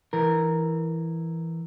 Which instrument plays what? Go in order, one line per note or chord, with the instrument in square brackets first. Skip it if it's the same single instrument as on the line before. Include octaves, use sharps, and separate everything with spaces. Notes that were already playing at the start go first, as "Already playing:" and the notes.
[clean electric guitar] E3 A#4